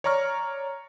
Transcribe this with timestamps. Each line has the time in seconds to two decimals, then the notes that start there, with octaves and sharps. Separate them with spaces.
0.04 C#5 D5 A#5 C#6 F6